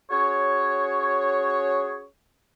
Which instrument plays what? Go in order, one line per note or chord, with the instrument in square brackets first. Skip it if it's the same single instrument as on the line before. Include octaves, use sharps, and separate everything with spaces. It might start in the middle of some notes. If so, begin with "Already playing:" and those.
[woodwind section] C#4 F#4 G#4 C#5